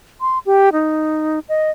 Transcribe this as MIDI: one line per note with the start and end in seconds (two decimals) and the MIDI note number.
0.21 0.39 84
0.46 0.69 67
0.73 1.39 63
1.49 1.71 75